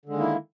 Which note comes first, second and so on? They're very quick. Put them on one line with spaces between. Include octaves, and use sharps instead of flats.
D3 G#3 D#3 A#3 E4